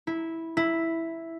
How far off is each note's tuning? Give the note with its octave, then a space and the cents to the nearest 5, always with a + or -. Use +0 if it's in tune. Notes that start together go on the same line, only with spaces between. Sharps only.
E4 -10
E4 +0